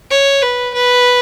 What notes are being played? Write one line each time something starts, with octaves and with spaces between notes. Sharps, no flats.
C#5
B4
B4